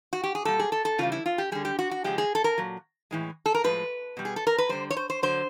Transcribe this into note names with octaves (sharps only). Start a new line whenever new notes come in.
F#4
G4
G#4
A#2 G3 A4
G#4
A4
A4
C#3 E3 G3 F4
E4
F4
G4
D3 G3 G#4
G4
F#4
F#4
C#3 F3 G#3 G4
G#4
A4
A#4
A#2 F#3
A2 E3 G#3
A4
A#4
A2 F3 G#3 B4
B2 G3
G#4
A4
A#4
B4
D3 G3 C5
C#5
C5
C5
D3 F#3 C5